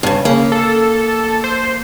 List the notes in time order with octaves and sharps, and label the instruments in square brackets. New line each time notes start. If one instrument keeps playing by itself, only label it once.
[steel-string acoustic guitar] G2 C#3
[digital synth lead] C#3 [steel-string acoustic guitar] A#3
[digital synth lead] A4
C5